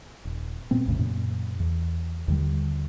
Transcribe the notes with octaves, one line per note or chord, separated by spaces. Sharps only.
D#1
A#2 B3 C4
A1 E2 A2 C#3
F#2 A#2 C#3
E2
D#2 D3 G3